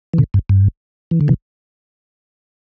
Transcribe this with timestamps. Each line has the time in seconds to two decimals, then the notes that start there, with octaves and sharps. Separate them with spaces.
0.13 E3
0.18 B2 D3
0.34 G2
0.49 G2
1.11 E3
1.21 D3
1.28 C3 E3